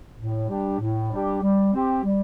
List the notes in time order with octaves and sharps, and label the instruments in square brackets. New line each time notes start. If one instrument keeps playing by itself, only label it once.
[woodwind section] A2
G3 D4 G4
A2
G3 D4 G4
G3
C4 G4
G3